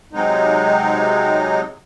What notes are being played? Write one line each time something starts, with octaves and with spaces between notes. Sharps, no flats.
C3 F#3 G#3 D#4